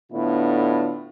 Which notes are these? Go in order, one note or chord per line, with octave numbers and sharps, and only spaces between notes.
A2 D3 B3 D4 E4 F4